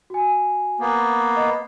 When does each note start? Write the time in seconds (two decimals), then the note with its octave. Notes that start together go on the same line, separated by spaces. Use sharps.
0.10 F#4 G#5
0.80 A#3 B3
1.36 D#5